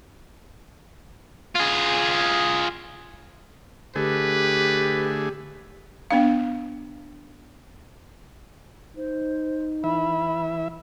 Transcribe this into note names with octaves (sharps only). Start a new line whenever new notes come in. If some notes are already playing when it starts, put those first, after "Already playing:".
F4 G#4
D3 A3 G4 G#4 B4
B3 D4 F5
D#4 C5
E3 E5 B5